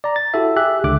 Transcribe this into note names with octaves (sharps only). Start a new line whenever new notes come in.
D5 A#5
A6
E4 F#4 G4 A4 E5
G4 G#4 E5 F#6
C#2 D3 E5 D6 F#6